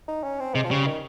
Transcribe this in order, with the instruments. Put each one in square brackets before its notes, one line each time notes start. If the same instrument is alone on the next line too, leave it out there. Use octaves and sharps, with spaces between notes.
[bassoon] D#4
C#4
C4
[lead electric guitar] C3 [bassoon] G#3
[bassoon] F3
[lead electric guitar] C#3 [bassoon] G3
[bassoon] D#3